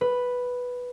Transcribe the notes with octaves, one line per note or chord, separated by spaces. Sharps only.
B4